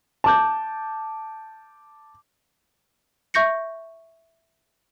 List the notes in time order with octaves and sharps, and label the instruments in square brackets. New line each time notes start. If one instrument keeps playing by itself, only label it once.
[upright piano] A5 D6 G6
[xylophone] E5 C#6 G6 A#6 C#7